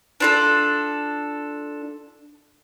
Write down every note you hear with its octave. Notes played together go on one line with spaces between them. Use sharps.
D4 F4 A4